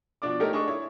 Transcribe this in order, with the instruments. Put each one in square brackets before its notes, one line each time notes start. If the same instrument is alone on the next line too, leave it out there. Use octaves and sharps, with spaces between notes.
[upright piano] B2 F3 D4 D5 D6
A3 D#4 G4 A4 A#4 C#5
D4 G#4 D#5 C#6
E4 C#5